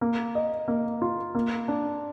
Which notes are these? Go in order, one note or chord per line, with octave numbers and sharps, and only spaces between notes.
A#3
D#5
A#3
F4
A#3
D4